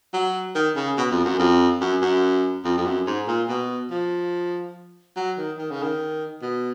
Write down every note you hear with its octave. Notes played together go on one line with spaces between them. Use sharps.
F#3
D#3
C#3
B2
F2
F#2
F2
F#2
F#2
F2
F2
F#2
G#2
A#2
B2
F3
F#3
D#3
D#3
C#3
D#3
B2